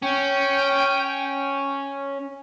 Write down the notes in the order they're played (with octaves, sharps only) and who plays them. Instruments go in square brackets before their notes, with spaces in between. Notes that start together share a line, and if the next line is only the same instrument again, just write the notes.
[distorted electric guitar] C#4 [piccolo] G5